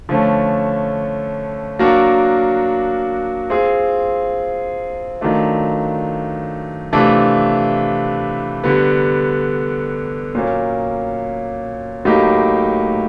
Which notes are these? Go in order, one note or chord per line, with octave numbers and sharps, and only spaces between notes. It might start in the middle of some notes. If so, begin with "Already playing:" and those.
D3 F3 A3 C#4
F#3 A#3 D4 F#4 A#4
C4 F4 G#4
D#3 F#3 A3 D4 F4
C3 E3 A3 D4 F4
D3 G3 B3
A#2 F#3 A#3 C#4
A2 F#3 A#3 D#4 G4